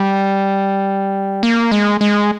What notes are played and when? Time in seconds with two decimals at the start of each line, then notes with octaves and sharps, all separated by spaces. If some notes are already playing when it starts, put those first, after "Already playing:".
Already playing: G3
1.43 A#3
1.71 G#3
2.01 G#3